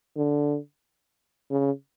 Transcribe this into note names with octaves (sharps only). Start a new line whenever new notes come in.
D3
C#3